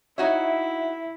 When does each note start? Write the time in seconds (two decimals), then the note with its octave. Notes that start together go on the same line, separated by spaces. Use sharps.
0.18 D#4 E4 F#4 C#5 E5